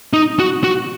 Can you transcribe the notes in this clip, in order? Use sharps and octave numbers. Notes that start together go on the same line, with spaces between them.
D#4
F#4
F#4